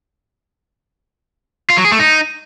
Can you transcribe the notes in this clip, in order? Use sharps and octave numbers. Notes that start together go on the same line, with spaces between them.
F4
F#3
G#4
A3
D#4